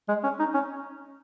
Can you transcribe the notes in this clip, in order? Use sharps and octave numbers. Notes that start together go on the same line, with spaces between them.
G#3
C#4
D#4
C#4